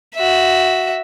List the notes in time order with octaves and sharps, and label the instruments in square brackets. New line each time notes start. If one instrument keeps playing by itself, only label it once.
[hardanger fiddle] F#4 E5